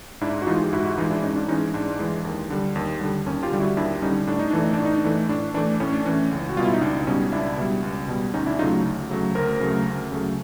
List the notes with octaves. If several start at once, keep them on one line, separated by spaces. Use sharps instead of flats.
G#2 D4 E4
F#4
E3 G#3 D#4 F4
G4
G#2 E4 F#4
E4 F#4
E3 G#3 D#4 F4
D4 E4
G#2 C#4 D#4
D4
E3 G#3 C#4 D#4
G#2 D4
E3 G#3
D#2
D3 G3
D#2
D3 G3
D#2 C#4
F4 G4
D3 G3
E4 F#4
D#2 D4 E4
D3 G3 C#4 D#4
A2 D4
D#4
E3 A3 D4
D#4
D4
A2
D#4
D4
E3 A3
A2 D4
E3 A3 D4
A2 C#4
D4
E3 A3 C#4
C#2
F#4
B2 G3 F4
E4
D#4
C#2 D4
B2 G3 C#4 D#4
C#2 D4 E4
B2 G3
C#2
B2 G3
D2 C#4 D#4
D4 E4
C#3 F#3 A3 D#4 F4
D2
C#3 F#3 A3
D2 A#4 C5
C#3 F#3 A3
D2
C#3 F#3 A3